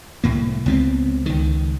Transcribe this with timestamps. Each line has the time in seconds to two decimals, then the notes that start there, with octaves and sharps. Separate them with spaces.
0.24 C2 A2 A#3
0.66 C#2 B3 C4
1.26 C#2 D#3